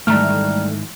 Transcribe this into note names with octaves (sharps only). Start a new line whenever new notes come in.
G#2 D#3 E3 G3 A3 A#5 F6